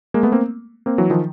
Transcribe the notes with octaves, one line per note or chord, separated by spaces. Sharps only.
G#3 A#3
A3 B3
A#3 C4
A#3 C4
E3 F#3
D#3 F3